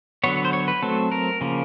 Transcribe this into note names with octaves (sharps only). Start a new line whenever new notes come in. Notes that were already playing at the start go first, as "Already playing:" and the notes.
D3 F#3 B3 C#5
C5
C#5
B4
F#3 A3 C4 A4
A#4
C#3 F3 A#3